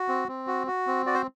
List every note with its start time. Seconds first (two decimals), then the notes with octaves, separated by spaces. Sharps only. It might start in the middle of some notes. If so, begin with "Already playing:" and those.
Already playing: F#4
0.09 C4
0.28 C4
0.47 F#4
0.67 F#4
0.87 C4
1.06 F#4 D5
1.14 C5